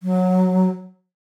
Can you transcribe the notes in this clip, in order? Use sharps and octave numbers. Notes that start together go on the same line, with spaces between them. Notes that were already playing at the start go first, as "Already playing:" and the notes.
F#3